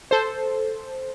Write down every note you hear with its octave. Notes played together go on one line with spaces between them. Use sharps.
A4 C5